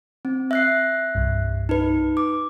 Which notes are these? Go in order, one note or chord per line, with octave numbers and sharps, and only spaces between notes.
C4
E5 F#6 C7
C2 G2
D#4 B4
D6